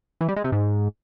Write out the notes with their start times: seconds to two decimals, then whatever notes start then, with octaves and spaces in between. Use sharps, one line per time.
0.21 E3
0.29 G3
0.36 G#3
0.44 C3
0.52 G#2